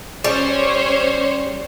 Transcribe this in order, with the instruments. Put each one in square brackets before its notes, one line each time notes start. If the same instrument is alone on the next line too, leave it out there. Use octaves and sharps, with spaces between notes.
[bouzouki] G3 [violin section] C#4 C5 C#5